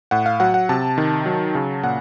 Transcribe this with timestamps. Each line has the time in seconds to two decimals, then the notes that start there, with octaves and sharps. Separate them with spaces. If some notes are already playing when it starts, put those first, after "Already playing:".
0.11 A2 F#5
0.26 F5
0.40 F#3 F#5
0.54 F#5
0.69 C3 A5
0.98 D#3
1.26 F#3
1.55 C#3
1.83 A#2 F#5